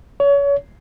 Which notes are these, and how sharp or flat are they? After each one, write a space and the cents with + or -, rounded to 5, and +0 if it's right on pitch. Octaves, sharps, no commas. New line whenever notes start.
C#5 +30